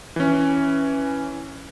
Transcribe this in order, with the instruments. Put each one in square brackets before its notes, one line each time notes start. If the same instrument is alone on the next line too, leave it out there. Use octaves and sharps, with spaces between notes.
[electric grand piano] E3 C#4